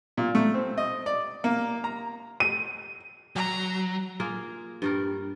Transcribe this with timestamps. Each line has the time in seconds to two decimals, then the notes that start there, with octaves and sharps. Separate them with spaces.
0.17 A#2
0.35 A3
0.54 C4
0.78 D#5
1.06 D5
1.44 A#3
1.84 A#5
2.40 D#7
3.36 F#3 A#5
4.20 A#3 F4 G#4
4.82 G2 G3 A#4